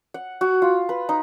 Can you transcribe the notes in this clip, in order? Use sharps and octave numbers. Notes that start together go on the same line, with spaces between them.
F#5
F#4
F4
B4
D#4